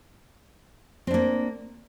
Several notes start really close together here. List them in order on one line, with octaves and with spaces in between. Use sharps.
C4 D4 A#3